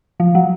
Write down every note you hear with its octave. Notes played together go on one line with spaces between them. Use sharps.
F3
F#3